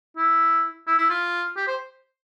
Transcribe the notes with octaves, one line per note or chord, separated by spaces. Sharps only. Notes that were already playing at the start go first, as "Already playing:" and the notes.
E4
E4
E4
F4
G4
C5